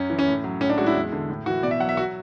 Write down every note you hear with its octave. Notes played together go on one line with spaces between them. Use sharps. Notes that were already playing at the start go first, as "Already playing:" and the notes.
Already playing: F#2 C#4
E3
C#4
A2
F#3
A2 C#4
D4
G#3 F#4
E4
E2
D3
A2
E3 F#4
B2 D5
E5
F#3 F#5
E5
F#4